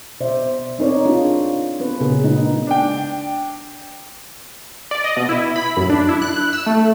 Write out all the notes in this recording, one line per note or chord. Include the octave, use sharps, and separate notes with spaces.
B2 C5 D5 E5
C4 D#4 A#4 C#5 D5
D4 F4 G#4
B3 C#4 B4
A#2 C#3 B3 G#4 A#4
G#3 D4 D#4 D#5
D4 G5
D5
D#5
B2
E4
B5
F#2
D4
E4
F#6
E6
A3